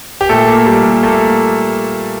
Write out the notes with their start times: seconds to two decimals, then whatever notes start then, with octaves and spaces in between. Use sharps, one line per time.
0.21 G4
0.29 A#2 A3 A4
0.48 A#3
0.67 G3
0.84 A#2
1.03 A3 A#3 A4